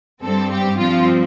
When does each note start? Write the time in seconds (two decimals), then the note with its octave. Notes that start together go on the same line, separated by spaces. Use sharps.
0.22 G2 G3 C4 A4
0.51 G4
0.79 G2 F3 C4 F4